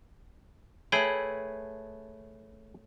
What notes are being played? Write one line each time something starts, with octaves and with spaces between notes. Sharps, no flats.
A3 G#4 B4 C#5 G5 B5